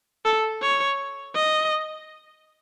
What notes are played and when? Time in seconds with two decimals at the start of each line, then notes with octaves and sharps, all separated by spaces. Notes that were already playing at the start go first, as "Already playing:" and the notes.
0.25 A4
0.62 C#5
1.35 D#5